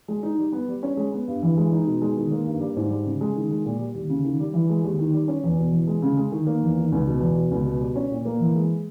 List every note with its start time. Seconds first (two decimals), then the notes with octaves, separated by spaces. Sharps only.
0.08 G#3
0.23 D#4
0.38 G3
0.52 B3
0.68 G3
0.83 C#4
0.97 G#3
1.12 B3
1.28 G2
1.43 E3
1.57 G#3
1.72 D#4
1.86 B2
2.02 G#3
2.17 D#3
2.31 A#3
2.45 G2
2.60 G3
2.76 G#2
2.90 G3
3.05 C#3
3.21 G#3
3.36 D#3
3.50 G#3
3.65 A#2
3.79 G3
3.94 D#2
4.09 C#3
4.24 D#3
4.40 G3
4.54 E3
4.70 G#3
4.84 D#2
4.99 D#3
5.13 G3
5.28 C#4
5.44 E2
5.58 B2
5.72 E3
5.87 G#3
6.02 C#3
6.17 G#3
6.32 D#3
6.47 A#3
6.62 E2
6.77 D#3
6.92 C#2
7.07 B2
7.21 E2
7.36 B2
7.51 C#2
7.66 B2
7.81 G3
7.96 C#4
8.11 A#2
8.25 A#3
8.40 E3
8.55 G#3